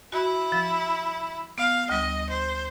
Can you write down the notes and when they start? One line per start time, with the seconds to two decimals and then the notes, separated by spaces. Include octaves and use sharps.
0.12 E4 F#4
0.52 F3
1.58 B3 F5
1.90 D2 G3 D#5
2.29 C5